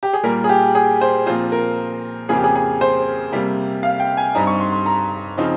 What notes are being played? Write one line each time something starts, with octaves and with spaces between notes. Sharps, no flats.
G4
G#4
A#2 G3 A#3 F4 A#4
G#4
G4
G#4
C5
A#2 F3 C4 F4 C5
A#4
F2 C#3 F3 A#3 G#4
G4
G#4
G#4
C5
C3 G3 A#3
F5
G5
G#5
G2 G3 C4 D#4 A#5
C#6
C6
C6
A#5
C#3 F3 C4 D#4